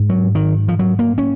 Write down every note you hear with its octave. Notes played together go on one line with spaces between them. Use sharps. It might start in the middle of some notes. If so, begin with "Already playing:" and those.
Already playing: G#2
F#3
D#3
F3
F#3
A#3
C#4